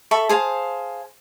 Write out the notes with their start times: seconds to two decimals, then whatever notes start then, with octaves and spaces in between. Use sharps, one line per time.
0.11 A4 E5 B5 C#6
0.29 G#4 C5 F5 A5